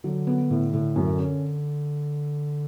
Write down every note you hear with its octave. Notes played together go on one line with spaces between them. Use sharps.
D3 F#3
B3
A2
A2
F#2
C#4